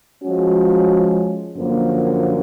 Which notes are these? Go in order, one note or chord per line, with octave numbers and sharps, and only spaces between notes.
F3 G#3 C#4 F#4
F#2 D3 F3 A#3